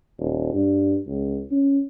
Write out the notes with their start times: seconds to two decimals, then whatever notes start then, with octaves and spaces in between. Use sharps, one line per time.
0.19 D#1
0.54 G2
1.07 C#2
1.51 C#4